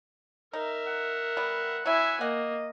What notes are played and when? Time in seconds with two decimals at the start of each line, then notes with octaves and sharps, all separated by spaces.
0.53 D#4 A#4 E5
0.87 F#5
1.37 G3 B3
1.86 F#3 E4 E5 G#5
2.21 A#3 D#5 F#5